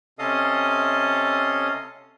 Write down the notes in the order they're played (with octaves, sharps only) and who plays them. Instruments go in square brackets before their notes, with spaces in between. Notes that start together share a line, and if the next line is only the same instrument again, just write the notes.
[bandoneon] C3 C#4 A4 D#5 F5 D#6